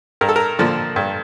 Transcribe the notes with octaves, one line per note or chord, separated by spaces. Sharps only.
G2 A#4
A4
A#4
D3 F3 A#3
G2